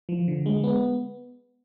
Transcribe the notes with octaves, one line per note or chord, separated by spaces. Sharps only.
F3
D3
G#3
B3